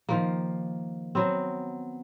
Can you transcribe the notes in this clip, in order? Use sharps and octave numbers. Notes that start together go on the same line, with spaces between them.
D#3 F3 A#3
F#3 B3 C4